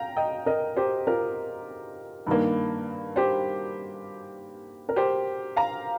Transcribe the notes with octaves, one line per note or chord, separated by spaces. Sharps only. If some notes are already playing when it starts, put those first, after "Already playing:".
Already playing: F5 G5 A#5
D#5 G5
A#4 D#5
G4 C5
F4 A#4
G2 D#3 A#3
G4 C5
A#4
G4 C5
F5 A#5